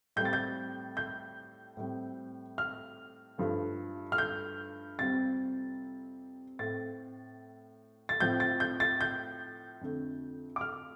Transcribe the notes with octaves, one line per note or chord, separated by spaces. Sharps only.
A2 G3 C4 G6
A6
G6
G6
A2 G3 C4
F6
G2 F3 A3
F6
G6
F2 C3 G3 C4 A6
A2 A3 C4 A6
A6
A2 F3 C4 G6
A6
G6
A6
G6
F2 D3 A3
D6
F6